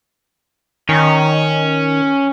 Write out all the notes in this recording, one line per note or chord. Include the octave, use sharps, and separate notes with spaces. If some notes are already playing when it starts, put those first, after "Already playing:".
D#3 C#4